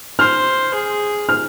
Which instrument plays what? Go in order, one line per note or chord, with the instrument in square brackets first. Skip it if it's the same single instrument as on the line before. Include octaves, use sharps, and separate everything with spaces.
[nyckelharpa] C5 [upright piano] F6
[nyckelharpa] G#4
[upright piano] F6